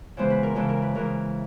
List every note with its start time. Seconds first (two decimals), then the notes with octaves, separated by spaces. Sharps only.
0.17 C#3 E3 G#3 B3 C5
0.30 B4
0.43 A#4
0.56 C#3 E3 G#3 A4
0.69 A#4
0.82 B4
0.94 C#3 E3 G#3 A#4